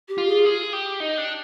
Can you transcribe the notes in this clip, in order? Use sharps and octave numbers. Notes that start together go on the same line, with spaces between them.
G4
F4
G#4
G#4
G4
D#4
D4